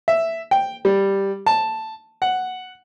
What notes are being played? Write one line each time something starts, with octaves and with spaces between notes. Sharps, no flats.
E5
G5
G3
A5
F#5